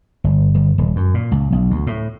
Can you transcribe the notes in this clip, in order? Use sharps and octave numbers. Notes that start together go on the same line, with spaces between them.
G1
G1
D#1
F#2
A#2
C#2
B1
D2
A2